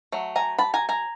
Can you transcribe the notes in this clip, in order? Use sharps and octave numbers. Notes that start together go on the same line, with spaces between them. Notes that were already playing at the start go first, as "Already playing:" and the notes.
F#3 A3
G#5 A#5
A5 B5
G#5 A#5
G#5 A#5